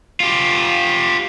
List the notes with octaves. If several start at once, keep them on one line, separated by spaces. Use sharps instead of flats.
F4 G4